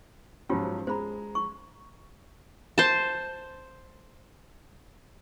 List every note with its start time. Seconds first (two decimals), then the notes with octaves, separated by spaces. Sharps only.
0.49 G#2 F3 F#3 C#4 F4 G4
0.87 G#3 C5 A#5 B5
1.35 C#6
2.78 C5 A5